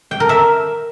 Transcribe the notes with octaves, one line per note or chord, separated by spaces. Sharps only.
G5
A#4
E5